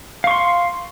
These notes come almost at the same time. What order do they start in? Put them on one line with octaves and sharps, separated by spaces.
F5 C#6 C6